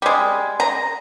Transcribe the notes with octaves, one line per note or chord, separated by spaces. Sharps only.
G3 G#3
A#5